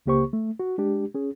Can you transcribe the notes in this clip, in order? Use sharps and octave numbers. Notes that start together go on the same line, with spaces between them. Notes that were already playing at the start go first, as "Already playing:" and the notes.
C#2 C#3 A#3 G4 C5 C#6
A3
F#4
G#3 D4 G4
C#4 G#4